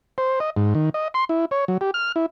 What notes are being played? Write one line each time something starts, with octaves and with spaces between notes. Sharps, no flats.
C5
D#5
G#2
D#3
D#5
C6
E4
C#5
F#3
G4
F6
E4